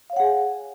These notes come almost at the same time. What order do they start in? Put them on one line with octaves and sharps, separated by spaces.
F5 C#5 F#5 G#4 G#5